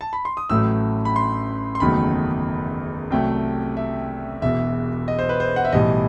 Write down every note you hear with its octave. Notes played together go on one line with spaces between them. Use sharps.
A5
B5
C6
D#6
A1 A2 F#3 A3 E6
B5
C6
C6
F#1 E2 D#3 F#3 A3 B5
C2 C3 F#3 A3 G5
E5
E1 E2 B2 E5
D#5
C5
B4
C5
F#5
E5
B1 A2 E3 G3 D#5